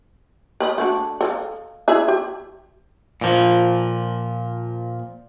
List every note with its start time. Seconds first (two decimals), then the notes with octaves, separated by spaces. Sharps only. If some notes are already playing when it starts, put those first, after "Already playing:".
0.60 A#4 B4 D#5
0.78 A3 D4 F#4
1.21 A4 D#5 F5
1.88 E4 G#4 E5
2.08 G4
3.21 A#2 F3